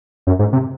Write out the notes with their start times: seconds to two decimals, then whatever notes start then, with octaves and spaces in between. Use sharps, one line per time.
0.27 F#2
0.39 G#2
0.53 C3